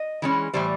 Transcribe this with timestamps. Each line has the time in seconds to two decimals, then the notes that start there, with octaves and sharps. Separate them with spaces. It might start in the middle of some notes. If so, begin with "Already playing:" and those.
Already playing: D#5
0.22 E3 G#3 C#4
0.54 A2 E3 G3 C5